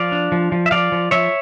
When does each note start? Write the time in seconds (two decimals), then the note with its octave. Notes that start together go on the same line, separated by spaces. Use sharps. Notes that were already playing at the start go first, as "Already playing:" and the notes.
Already playing: F3 D5 F5
0.12 D4
0.32 F3
0.52 F3
0.66 E5
0.71 F3 D5 F5
0.92 F3
1.11 F3 C#5 E5